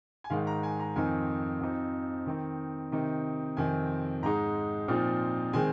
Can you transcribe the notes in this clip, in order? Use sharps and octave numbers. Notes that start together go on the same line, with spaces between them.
G#5
G#2 D#3 G#3 F5
A#5
G#5
A#5
F2 D#3 C4 D#4 G#5
F2 F3 C4 D#4
D#3 C4 D#4
C3 D#3 C4 D#4
F2 C3 D#3 C4 G#5
G#2 G#3 D#4 A#5
A#2 F3 C4 D#4
D#3 G#3 C4 G#5